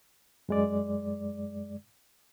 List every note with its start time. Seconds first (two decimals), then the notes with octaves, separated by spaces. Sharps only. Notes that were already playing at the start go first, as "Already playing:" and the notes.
0.49 F#2 G#3 D5